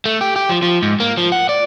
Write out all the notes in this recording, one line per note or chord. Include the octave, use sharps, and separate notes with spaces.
A3
G4
G4
F3
F3
G#2
A#3
F3
F#5
D5